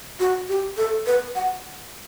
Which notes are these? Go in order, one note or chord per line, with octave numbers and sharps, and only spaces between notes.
F#4
G4
A4
B4
F#5